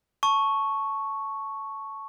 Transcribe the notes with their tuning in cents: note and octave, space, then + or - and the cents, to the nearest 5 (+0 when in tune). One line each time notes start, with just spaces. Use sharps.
A5 +0 C#6 +0